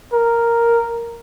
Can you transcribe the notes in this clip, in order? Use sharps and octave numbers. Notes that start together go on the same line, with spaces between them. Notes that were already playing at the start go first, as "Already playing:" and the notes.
A#4